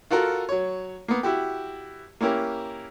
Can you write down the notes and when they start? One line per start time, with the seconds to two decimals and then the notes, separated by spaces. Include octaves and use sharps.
0.11 F4 F#4 A4 A#4 F#5
0.49 F#3 C#5
1.08 A#3 B3
1.23 E4 F#4 G4
2.21 A#3 C#4 E4 G4 A#4